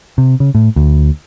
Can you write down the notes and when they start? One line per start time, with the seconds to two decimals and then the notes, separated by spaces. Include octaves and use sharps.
0.18 C3
0.40 C#3
0.55 A2
0.76 D2